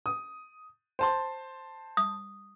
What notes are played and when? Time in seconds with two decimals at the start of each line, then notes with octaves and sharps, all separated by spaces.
0.06 D#6
0.99 C5 A5 C6
1.97 D#6